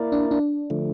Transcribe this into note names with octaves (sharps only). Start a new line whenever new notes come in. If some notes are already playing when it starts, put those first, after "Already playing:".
Already playing: A#3 E4 A#4 D5
D4
D4
D3 F3 A3